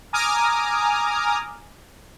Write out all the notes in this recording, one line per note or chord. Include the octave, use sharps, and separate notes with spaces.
G#5 A#5 D6 D#6 F6